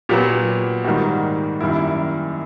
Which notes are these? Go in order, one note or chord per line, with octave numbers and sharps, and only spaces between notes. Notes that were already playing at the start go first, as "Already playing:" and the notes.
A#2 F#3 B3 G4
G#2 D#3 G3 A#3 F#4
F#2 D#3 G3 A#3 E4